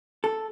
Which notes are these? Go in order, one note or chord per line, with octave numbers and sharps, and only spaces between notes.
A4